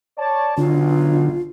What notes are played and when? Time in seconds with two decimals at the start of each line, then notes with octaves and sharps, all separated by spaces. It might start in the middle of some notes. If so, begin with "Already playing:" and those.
0.18 C#5 D5 A5
0.58 B1 D3 F4